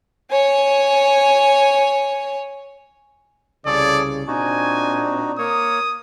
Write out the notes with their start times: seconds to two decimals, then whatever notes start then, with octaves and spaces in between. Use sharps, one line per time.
0.31 C#5 G#5
3.66 C2 C#3 G#4 A4 C#5 D5
4.27 A#2 C4 D4 D#4 F#4 G#5
5.38 A#3 C#5 D#6